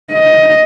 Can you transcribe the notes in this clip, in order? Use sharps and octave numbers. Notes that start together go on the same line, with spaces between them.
D#5